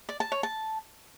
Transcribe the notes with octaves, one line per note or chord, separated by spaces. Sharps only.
D5
A5
C#5
A5